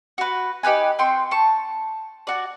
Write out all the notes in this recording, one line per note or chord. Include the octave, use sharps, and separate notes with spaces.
F#4 B4
D#4 G4 B4 G#5
C4 G5 C6 C#6
A5 C#6
F#4 D5